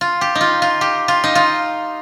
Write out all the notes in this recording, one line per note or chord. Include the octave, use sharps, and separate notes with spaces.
F4
G4
D#4
F4
F4
G4
F4
D#4
F4